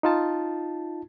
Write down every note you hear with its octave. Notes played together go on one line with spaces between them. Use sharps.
D#4 F4 A5